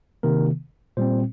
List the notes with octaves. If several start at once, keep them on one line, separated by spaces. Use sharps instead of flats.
C3 D#3 A#3 A#4
A#2 G3 C4 C5